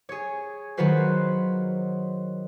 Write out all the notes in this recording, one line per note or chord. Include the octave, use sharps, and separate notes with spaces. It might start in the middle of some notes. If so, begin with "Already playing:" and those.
G#4 C#5
D#3 F#3 F4 F#4 B4 C5